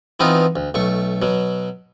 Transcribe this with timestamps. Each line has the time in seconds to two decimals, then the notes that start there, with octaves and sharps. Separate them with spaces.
0.20 E3 B3 C4 D#4 F4
0.56 D2
0.74 B1 A3 C#6
1.22 B2 F#3